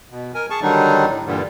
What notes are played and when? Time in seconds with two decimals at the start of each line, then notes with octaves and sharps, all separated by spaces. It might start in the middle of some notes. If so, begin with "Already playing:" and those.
0.10 B2
0.34 A#4 G#5
0.50 G#4 A5 C#6
0.62 D3 D#3 F#3 G3 D4 D#4
1.09 A2
1.26 G2 A#2 D3 E3 G3